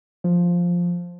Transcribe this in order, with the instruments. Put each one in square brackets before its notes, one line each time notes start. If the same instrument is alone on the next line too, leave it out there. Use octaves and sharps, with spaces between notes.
[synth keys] F3